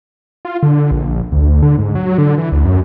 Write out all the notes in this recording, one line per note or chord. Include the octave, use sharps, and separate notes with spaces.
F4
D3
A#1
D2
D3
G#2
F#3
D3
E3
D2
F#2